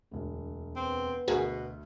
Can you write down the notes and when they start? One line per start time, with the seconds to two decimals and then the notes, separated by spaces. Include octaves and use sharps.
0.11 E1 D2
0.76 B3 C4
1.28 D2 B2 F#4 G#4 A#4